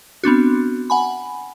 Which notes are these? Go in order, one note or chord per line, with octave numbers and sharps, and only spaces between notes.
B3 C4 D4 F#4
F#5 G#5 B5